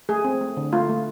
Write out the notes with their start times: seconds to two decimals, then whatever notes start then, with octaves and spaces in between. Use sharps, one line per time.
0.09 A3 G#4
0.25 C4
0.41 A3
0.57 D3
0.73 A3 F4
0.89 A3